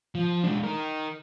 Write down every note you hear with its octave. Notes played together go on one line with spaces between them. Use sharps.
F3
G#3 D4
D#4 A#4